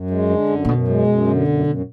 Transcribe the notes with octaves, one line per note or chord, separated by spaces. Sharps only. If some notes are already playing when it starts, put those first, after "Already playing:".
Already playing: F#2
G#3
D3
F#2
A#2
F#2 B2
G#3
F#2
D3
F#2
F#2